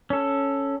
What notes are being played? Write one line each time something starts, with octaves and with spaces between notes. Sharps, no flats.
C#4 A4